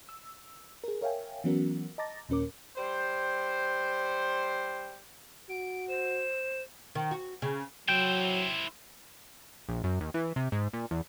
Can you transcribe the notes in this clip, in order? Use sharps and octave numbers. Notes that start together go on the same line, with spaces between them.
E6
G#4 A#4
A#4 C#5 E5 F5 G5 G#5
E3 F#3 B3 C#4 F#4 A#4
D#5 A5 A#5 D6 A6 A#6
D#2 A#2 C#4 A#4 D6
G3 C5
F#4 D7
C5 E7
D#3
F#4
C#3
F#3 E4 C5 G5
A#1
F#2
D#2
E3
C3
G#2
A#2
E2